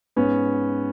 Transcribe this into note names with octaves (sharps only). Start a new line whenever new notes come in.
G#2 B3 C#4